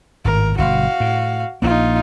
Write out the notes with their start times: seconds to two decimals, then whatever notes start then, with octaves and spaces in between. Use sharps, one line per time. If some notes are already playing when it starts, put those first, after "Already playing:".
0.25 G#1 A2 A#4
0.58 G1 B2 F#4 F5
1.00 A2
1.62 A#1 A#3 D#4 F4